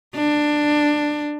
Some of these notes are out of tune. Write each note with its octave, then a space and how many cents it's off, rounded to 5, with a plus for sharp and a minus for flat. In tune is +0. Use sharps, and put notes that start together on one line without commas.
D4 +15